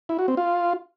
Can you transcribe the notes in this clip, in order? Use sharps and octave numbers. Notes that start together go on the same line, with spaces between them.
E4
F#4
C4
F4